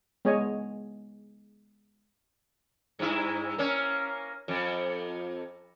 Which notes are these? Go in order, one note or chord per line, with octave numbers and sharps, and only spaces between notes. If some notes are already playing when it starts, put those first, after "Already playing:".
G#3 B3 G#4 C#5 D#5 G#5
G2 E4
A#3 C#4
F2